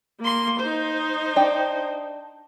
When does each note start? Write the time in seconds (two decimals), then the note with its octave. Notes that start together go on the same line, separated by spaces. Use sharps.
0.20 A#3 C6
0.60 D#4 C5
1.36 D4 G5